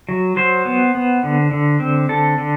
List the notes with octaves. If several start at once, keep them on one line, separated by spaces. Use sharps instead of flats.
F#3
F#3 C5
B3
B3
D3
D3
C4
D3 A4
D3